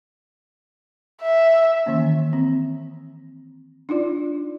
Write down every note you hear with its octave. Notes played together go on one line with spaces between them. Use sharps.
E5
D#3 E3 A#3 C#4
C4
D4 D#4 F4 D5